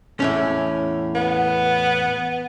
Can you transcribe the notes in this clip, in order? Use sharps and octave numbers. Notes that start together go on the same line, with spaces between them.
E2 A2 C#4
B3